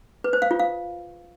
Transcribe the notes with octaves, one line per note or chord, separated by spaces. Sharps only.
B4
C5
F5
F4
F5